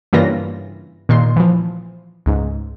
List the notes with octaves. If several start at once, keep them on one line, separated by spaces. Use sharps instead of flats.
G2 C#3 E3 A#3 F4 A#6
A#2 D#3 C6
E3 F3
C#2 G#2